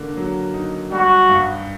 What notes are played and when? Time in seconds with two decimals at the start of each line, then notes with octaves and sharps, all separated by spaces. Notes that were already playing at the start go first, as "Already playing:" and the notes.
Already playing: D3 A#3
0.17 F#3
0.54 D#4
0.92 G3 F#4
1.29 G2